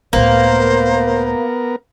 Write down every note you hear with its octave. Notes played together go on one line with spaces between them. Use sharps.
C#2 A2 A#3 B3 A#4 C5